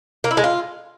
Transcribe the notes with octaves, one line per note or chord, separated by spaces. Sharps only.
A#3
E4
G#3
F4